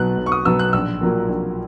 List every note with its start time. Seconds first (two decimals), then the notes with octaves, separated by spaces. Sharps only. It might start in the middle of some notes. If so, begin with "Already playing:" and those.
Already playing: B1 B2 F#3 B3 F#6
0.17 B1
0.26 C#6
0.32 D#6
0.45 B2 F#3 B3 E6
0.59 F#6
0.73 A#1 E6
1.01 A#2 F#3 A#3
1.29 A#1